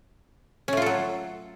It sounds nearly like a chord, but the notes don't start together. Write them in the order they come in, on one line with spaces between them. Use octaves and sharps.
C#4 A3 F4 A4 F#3